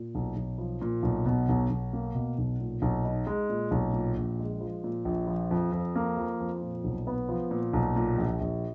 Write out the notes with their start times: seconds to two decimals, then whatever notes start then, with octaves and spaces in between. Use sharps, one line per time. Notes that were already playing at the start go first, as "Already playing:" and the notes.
Already playing: A#2
0.15 B1
0.36 B1
0.58 F3
0.82 A#2
1.03 B1
1.26 B2
1.49 B1
1.70 B1
1.93 A#3
2.15 B2
2.38 B1
2.60 A#2
2.82 B1
3.05 D#4
3.27 G#3
3.50 A#2
3.71 B1
3.93 A#2
4.16 A#1
4.39 G#3
4.61 F3
4.84 A#2
5.05 A#1
5.27 F3
5.51 F2
5.72 F2
5.95 A#3
6.17 F3
6.40 F2
6.62 A#2
6.84 B1
7.07 B3
7.29 F3
7.51 A#2
7.73 B1
7.96 A#2
8.18 A#1
8.41 A#1